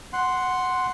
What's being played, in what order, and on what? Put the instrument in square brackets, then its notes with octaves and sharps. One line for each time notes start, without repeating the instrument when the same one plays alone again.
[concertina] F#5 C6